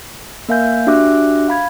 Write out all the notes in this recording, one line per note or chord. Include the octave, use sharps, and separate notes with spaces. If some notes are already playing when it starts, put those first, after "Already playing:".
A#3 A#4 E5 F5 G#5 G6
D4 F#4 G4 E5 D6 F#6
F5 B5 G#6